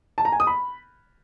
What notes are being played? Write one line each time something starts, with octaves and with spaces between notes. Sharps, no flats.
A5
A#5
G#5
D#6
B5